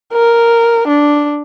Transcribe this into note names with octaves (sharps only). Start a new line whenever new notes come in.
A#4
D4